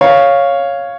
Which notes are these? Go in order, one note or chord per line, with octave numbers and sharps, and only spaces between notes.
C#5 F5